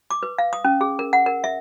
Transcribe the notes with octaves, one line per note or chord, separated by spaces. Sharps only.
D6
B4
F5
D#6
C#4
G#4
A#4
F#5
A#4
E5